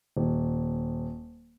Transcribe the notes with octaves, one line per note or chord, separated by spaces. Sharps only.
D#1